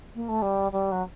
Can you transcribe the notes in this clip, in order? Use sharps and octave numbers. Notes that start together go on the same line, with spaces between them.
A#3
A3
G3
G3
F#3